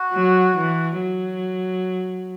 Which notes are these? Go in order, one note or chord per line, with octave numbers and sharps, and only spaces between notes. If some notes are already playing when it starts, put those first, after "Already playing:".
Already playing: F#4
F#3
E3
F#3